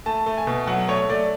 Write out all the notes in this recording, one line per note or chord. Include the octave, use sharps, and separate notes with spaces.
A3 A5
A3
G#5
B2
F#3 F#5
A3 C#5
A3 D5